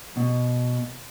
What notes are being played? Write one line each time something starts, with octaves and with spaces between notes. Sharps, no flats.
B2